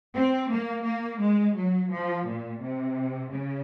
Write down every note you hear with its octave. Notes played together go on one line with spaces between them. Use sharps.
C4
A#3
A#3
G#3
F#3
F3
A#2
C3
C#3